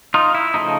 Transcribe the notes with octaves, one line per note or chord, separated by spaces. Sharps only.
D#4 F4
E4
C#3 F3 A3 D#4